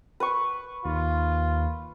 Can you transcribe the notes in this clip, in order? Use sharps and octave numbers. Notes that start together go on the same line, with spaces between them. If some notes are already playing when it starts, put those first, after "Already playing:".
B4 C#6
D#2 F4